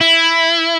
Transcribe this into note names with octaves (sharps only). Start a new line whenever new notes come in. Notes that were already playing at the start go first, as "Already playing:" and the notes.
E4